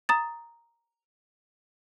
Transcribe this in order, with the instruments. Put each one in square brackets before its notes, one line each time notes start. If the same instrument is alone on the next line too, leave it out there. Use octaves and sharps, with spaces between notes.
[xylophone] A#5 D#6 A6